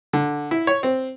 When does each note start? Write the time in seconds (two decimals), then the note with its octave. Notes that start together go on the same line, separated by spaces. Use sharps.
0.13 D3
0.51 E4
0.67 C#5
0.83 C4